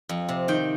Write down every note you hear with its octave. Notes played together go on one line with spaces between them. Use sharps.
F2
C3
D#3 G5